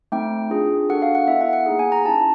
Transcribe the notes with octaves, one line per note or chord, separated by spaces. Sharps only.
A3 C4 D#4 G5
D4 F4 G#4
D4 F#4 A4 F#5
F5
F#5
B3 E4 A4 E5
F#5
F#5
A#3 D#4 G#4
G#5
A#5
C#4 E4 G4 A5